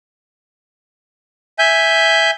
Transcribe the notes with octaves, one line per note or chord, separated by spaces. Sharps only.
E5 G#5 G6